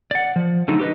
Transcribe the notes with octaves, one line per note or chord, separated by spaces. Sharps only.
D5 F#5
F3
D3 F#3 A3 D#4
G4 B4 D#5